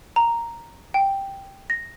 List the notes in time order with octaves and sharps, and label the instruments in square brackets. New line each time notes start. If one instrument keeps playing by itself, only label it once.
[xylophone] A#5
G5
A#6